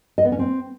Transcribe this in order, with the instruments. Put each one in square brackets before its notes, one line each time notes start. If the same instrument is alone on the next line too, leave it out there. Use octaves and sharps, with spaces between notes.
[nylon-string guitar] D#5
B3
C#4
C4